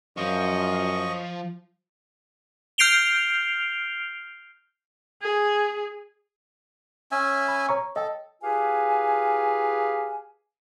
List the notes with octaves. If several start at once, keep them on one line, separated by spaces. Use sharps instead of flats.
F#2 F3 D#5 C#6
F6 G6 C7 D7 F7 G7
G#4 G#5
C#4 E5 G#5
B5
C#5 A#5 C#6
A4 D#5 G5
F4 G4 G#4 B4 F5 G#5